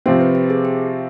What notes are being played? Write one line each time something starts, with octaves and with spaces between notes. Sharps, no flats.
C3 F3 C4 G4
B4
G4
G#4
G4